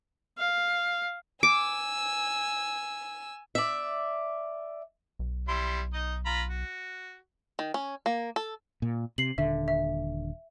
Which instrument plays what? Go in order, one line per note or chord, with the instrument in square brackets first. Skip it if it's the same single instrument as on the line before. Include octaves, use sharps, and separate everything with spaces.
[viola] F5
[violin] G#5 E6 [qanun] D6
[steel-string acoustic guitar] D5 E5
[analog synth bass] B1
[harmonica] G3 E4 C6
D#4 D#5
F4 A#5 B5
F#4
[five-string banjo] D#3
C#4
A#3
A4
[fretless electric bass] A#2
[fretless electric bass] C3 [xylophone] C7 F#7
[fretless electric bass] D#1 D3 [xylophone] E5
[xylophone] E5